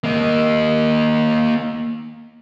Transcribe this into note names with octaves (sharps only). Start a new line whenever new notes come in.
A#3 D#5